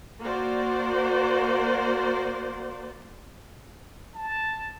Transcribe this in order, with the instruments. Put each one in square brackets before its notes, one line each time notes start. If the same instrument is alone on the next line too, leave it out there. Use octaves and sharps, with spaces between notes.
[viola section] A#3 F#4 C5 D5
[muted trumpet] A5